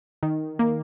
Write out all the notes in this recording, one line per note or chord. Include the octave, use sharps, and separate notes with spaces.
D#3
A#3